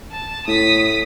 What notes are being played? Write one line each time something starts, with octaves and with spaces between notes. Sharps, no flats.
A5
A2 D#6 B6